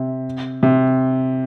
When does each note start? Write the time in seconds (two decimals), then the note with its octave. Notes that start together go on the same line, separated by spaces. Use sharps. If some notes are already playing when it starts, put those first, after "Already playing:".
Already playing: C3
0.63 C3